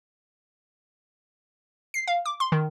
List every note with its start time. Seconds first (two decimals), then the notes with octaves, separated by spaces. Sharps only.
1.94 C7
2.08 F5
2.26 D6
2.40 C6
2.52 D#3